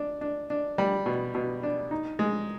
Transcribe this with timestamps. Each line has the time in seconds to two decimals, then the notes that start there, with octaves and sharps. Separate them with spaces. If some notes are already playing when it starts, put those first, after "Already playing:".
Already playing: D4
0.21 D4
0.50 D4
0.78 G3
1.06 B2
1.35 B2
1.63 D4
1.91 D#4
2.19 G#3